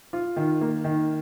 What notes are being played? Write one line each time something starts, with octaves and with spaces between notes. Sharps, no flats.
F4
D#3
A#3
D#3